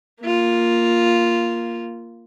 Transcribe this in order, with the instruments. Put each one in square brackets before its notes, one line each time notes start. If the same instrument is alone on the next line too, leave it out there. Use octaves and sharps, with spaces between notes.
[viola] A#3 F4